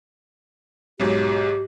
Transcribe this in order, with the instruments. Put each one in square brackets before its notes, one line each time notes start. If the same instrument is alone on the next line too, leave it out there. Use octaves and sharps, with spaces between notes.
[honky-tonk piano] B1 G#2 F#3 [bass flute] G4